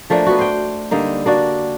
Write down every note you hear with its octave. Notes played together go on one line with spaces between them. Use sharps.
F3 A3 A#3 D4
B3 F#4
C5 G5
D3 G3 A#3 D#4
A#3 D4 F#4 D5